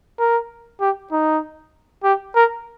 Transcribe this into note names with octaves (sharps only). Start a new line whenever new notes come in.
A#4
G4
D#4
G4
A#4